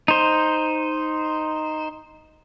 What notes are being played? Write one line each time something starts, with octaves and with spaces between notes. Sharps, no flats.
D#4 C5